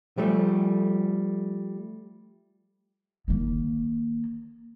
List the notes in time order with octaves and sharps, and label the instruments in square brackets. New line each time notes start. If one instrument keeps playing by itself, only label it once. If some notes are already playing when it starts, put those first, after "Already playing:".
[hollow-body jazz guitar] F3 G3 A3
[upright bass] D#3 A#3